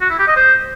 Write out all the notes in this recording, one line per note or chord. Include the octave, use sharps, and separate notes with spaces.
F#4
E4
G4
D#5
C5